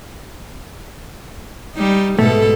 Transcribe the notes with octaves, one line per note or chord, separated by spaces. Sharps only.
G3 D#4
G#2 B2 A3 A4